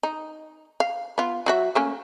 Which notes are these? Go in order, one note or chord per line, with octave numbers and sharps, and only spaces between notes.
D#4
F5
B3 F4
F#3 F#4 E5
A3 A#3 C#4